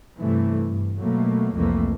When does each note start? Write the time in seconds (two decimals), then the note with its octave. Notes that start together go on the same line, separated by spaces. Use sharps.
0.19 G2 C3 E3 A3
0.67 G2
0.99 B2 F#3 A3 A#3
1.54 C2 F2 E3 A3 A#3